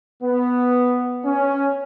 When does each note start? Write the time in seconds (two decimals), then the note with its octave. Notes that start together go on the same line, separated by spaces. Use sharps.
0.23 B3
1.25 C#4